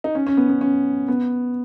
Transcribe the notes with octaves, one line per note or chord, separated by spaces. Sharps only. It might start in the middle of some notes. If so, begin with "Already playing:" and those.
D#4
C#4
C#4
B3
B3
C#4
B3